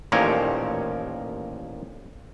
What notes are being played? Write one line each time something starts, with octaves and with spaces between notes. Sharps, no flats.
A1 D#2 A#2 F3 A#4 C#5